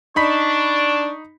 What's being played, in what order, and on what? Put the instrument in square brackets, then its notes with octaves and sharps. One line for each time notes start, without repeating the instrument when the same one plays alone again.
[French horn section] D4 [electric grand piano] D#4 B5 B6 [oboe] C#6